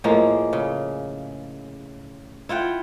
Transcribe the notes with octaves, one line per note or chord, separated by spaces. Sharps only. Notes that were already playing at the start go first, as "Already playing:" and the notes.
A2 F3 G#3 A#3
C#3
E4 F4 F#5 G5